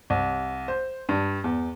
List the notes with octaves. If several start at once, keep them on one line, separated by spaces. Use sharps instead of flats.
C2
C5
G2
E2